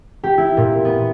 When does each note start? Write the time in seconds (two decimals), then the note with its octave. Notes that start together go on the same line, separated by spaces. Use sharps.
0.24 G4
0.38 E4
0.57 A#2
0.85 B3